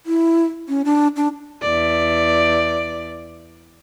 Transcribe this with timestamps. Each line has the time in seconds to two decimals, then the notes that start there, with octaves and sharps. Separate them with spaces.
0.06 E4
0.68 C#4
0.85 D4
1.16 D4
1.61 E2 D5